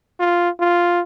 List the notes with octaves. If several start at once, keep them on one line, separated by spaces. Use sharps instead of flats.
F4
F4